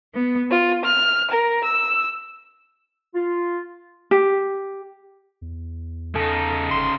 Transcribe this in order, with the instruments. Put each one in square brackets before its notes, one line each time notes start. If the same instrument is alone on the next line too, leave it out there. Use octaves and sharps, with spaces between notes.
[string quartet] B3
F4
F6
A#4
E6
[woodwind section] F4
[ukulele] G4
[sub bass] E2
[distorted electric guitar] C#3 D#4 [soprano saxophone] A4
[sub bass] G1 [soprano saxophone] C6